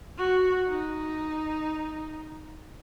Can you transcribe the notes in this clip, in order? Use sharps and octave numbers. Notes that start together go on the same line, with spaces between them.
F#4
D#4